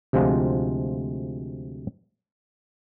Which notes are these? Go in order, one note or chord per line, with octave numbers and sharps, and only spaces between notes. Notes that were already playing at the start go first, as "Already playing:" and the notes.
D2 C3 F3 G#3 F4 F#5